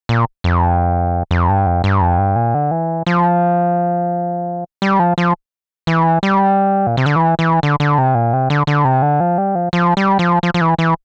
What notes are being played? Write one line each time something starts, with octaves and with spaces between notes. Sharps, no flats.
A#2
F2
F2
G2
F2
G2
F2
G2
A#2
D3
E3
F3
G3
F3
F3
E3
G3
A#2
C3
D3
E3
E3
D3
D3
C3
A#2
C3
D3
D3
C3
D3
F3
G3
F3
F3
G3
F3
F3
F3
E3
E3